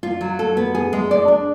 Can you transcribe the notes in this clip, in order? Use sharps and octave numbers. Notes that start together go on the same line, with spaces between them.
F4
F#3
A4
B3
G#4
G#3
D5
D4